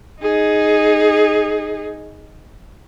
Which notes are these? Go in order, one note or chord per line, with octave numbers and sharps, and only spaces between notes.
D#4 G#4